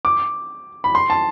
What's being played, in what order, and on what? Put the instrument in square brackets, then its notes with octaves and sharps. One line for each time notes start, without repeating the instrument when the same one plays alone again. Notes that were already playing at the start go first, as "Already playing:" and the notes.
[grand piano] D6
B5
C6
A5